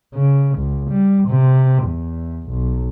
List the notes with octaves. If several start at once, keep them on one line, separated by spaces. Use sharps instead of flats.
C#3
C#2
G3
C3
E2
B1